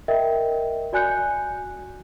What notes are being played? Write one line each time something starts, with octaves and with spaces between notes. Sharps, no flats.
A#4 D#5 E5 G5
F#4 D5 G#5 F#6 G6 C#7